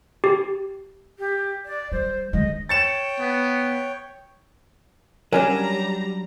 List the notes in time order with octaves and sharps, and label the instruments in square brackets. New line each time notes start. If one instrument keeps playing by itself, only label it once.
[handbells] G4
[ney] G4
D5
[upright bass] G3 [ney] C5
[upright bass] D3 G#3 [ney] D#5
[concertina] C#5 G5 [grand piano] A6 C#7 E7
[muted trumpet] B3
[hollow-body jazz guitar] F#3 C#4 D4 [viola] G3 A#5 [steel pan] A#4 G#5